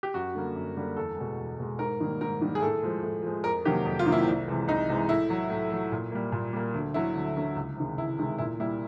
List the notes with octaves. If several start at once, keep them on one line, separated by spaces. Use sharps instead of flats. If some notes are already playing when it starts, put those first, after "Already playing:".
G4
F#2 F#4
D3 G3 A#3
F#2
D3 G3 A#3
E2 A4
B2 G#3
E2
B2 G#3
G#2 A#4
D#3 G3 A#3
G#2 A#4
D#3 G3 A#3
G#4
A2 A4
F3 G#3
A2
F3 G#3
F2 A#4
C3 D#3 F#3 A#3 G4
F2
F4
C3 D#3 F#3 A#3
E4
C2
C3 E3 G#3
C2 D#4
C3 E3 G#3
A2 E4
F#3 A3
A2
F#3 A3
A#2
G3 A#3
A#2
G3 A#3
D2
D3 F#3 A3 E4
D2
D3 F#3 A3
C#2
C3 D#3 G#3
C#2 E4
C3 D#3 G#3
A#2 E4
G3 A#3 E4